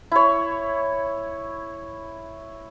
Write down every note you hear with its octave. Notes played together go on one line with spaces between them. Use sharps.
E4 C#5